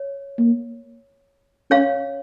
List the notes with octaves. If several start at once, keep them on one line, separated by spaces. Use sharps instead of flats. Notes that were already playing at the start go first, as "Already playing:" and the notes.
Already playing: C#5
A#3
C#4 C#5 F5